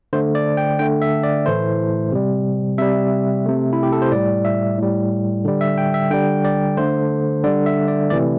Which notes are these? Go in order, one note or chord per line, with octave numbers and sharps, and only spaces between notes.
D3 A3 C5
D5
G5
D3 A3 G5
E5
D5
A2 E3 A3 C5
C3 G3
C3 G3 E5
C3 A3
E4
G4
A4
C5
A2 G3 D5
E5
A2 G3
D3 G3
E5
G5
E5
D3 G3 G5
D5
D3 A3 C5
D3 G3 D5
E5
D5
C3 E3 A3 D5